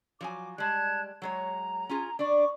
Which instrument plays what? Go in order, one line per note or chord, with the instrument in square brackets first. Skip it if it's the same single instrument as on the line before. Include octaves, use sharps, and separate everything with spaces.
[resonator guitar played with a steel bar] F3 F#3 G#5 [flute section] D6
[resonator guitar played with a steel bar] G3 G#3 [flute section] A5 F#6 G#6
[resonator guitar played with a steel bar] F#3 G#3 C#5 [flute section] A#5
[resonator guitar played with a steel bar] C#4 F4 G#4
[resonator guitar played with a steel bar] D4 D5 [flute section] C#6 D6